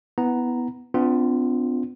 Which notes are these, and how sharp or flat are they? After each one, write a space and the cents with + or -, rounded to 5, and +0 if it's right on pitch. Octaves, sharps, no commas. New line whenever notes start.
B3 +0 E4 -20 A#5 +0
B3 +40 D4 -20 F4 +0